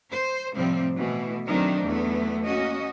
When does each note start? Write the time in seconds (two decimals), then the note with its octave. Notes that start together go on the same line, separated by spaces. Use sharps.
0.11 C5
0.54 A2 C3 F3 G3 C4
0.95 B2 E3 A3
1.46 D#3 F#3 A3 C4 D4 D#4
1.83 E2 F#3 A3 B3
2.44 A#3 C#4 F#4 D#5